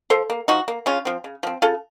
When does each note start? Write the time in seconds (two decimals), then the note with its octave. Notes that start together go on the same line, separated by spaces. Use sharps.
0.10 F3 A4 C5
0.30 A#3
0.48 F3 D#4 F#4
0.68 A#3
0.86 C#3 C#4 F4
1.05 F3 C4
1.24 C#3
1.43 F3 C4
1.62 C#3 F4 A4